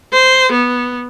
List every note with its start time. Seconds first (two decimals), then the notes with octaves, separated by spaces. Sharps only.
0.13 C5
0.52 B3